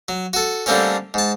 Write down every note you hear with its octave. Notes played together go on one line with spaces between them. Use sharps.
F#3
F#4 A4
D3 G3 A3 A#3 C4 C#4
G#2 A5